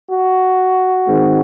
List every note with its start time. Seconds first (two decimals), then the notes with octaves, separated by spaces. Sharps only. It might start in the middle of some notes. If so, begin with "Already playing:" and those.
0.10 F#4
1.06 G#2 D#3 G#3 C4